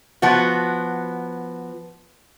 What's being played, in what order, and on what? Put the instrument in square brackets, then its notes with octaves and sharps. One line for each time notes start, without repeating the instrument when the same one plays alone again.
[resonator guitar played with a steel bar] F3 B3 F#4